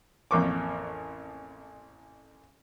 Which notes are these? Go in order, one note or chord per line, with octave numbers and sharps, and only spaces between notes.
A1 F2 A#3 C#6 D6